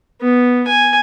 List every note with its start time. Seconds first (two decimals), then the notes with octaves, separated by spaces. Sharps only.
0.21 B3
0.67 G#5